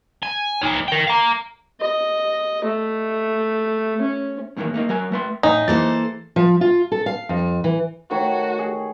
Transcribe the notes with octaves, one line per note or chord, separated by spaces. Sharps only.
G#5
D#4 C#5
A#4 G5
F5 A#5
D#5
A3
C#4
F#2 A2 D#3 E3 A#3
A3 A#3 D#4
F#3 A#4 G#5
A3 B4 C6
A2 D#4 G#5
E3 A#3 A4 C5 A6
F3
F4
A4
F5
F2
E3
D#3 A3 F#4 C#5
G#4